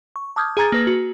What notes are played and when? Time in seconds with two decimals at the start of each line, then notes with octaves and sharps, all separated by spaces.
0.16 C#6
0.36 A5 D6 D#6 F6 G6 G#6
0.57 G#4 G#5 A#5 G#6 A6
0.72 A#3 B4 A#6
0.87 F#4